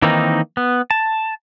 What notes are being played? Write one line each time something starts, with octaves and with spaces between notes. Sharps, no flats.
D#3 E3 A#3 C4 D#4
B3
A5